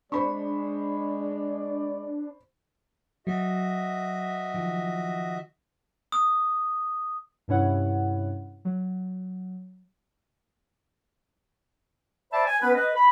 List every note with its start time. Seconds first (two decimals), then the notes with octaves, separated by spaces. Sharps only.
0.12 G#3 D4 C5 D5 B5 C#6
3.27 F#3 F#4 D#5 E5
4.54 D#3 F3
6.12 D#6
7.48 G2 C3 C#4 E4 C#5 F#5
8.65 F#3
12.32 C5 D5 E5 A5 B5
12.46 G#5
12.60 B3 C#4 B4
12.75 B4 D#5
12.95 B5